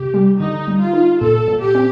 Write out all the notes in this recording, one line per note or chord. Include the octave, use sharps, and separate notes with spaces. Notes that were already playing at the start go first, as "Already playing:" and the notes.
Already playing: C3 G4
G3
D3 D#4
G3
F4
D#4
A#2 A4
A#2
G4
C4